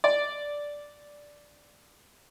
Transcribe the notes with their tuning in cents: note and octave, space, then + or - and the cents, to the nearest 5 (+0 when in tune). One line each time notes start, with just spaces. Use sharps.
D5 -5